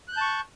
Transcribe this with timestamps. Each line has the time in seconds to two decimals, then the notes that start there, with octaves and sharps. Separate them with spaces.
0.08 F#6
0.12 G6
0.17 A5
0.21 C#6